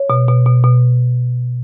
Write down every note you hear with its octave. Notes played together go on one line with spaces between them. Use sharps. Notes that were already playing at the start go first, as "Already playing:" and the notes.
Already playing: C#5
B2
B2
B2
B2